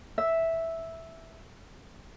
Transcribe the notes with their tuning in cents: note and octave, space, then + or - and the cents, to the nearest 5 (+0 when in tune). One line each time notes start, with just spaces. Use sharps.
E5 -5